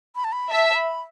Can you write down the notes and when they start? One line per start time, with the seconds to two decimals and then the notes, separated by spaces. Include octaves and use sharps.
0.15 B5
0.24 A5
0.32 B5
0.50 E5 A5
0.69 A5
0.75 B5